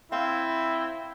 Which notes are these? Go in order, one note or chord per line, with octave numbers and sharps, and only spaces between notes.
C4 E4 F5